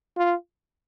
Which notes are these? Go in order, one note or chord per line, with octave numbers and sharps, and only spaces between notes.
F4